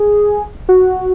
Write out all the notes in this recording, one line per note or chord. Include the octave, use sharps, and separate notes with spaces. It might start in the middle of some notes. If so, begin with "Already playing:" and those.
Already playing: G#4
F#4